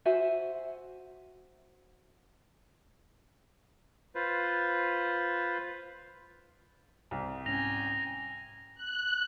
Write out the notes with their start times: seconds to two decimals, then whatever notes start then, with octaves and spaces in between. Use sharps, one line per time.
0.05 F#4 C5 E5 G#5
4.15 F4 B4 C5
7.11 C2
7.46 G#2 C#4 G5 G#5 A#6 F7
8.75 F#6